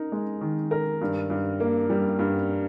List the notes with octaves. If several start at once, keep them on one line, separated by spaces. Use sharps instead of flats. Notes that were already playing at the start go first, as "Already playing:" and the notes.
Already playing: D#4 A#4
G#3
D#3
A#4
G2
G2
A#3
G3
G2